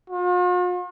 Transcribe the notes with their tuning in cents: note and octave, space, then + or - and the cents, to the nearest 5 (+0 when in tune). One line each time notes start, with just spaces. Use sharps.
F4 +45